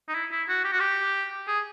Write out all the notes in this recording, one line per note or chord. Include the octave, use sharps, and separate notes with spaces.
D#4
E4
E4
F#4
G4
F#4
G4
G#4